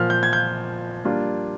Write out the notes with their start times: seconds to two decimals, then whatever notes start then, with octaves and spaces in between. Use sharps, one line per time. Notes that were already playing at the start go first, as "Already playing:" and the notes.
Already playing: A#2 F3 A#3 F6
0.10 G6
0.23 G#6
0.33 G6
1.05 G3 A#3 D4 F4